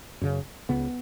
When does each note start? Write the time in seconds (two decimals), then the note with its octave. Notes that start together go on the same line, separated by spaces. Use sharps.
0.21 F#2 C#3
0.69 C#2 C#3 B3